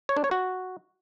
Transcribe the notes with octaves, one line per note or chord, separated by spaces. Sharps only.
C#5
D4
C#5
F#4